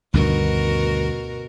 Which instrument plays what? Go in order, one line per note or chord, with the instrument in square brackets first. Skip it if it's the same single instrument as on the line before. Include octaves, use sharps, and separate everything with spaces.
[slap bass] D2 G2 D#3 [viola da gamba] B2 F#4 A#4